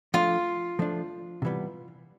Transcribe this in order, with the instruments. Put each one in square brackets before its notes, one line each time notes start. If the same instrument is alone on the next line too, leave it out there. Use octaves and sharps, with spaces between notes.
[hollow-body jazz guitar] F3 A3 D4 [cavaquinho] F4
[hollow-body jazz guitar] F3 A3 D4
C3 E3 G3 B3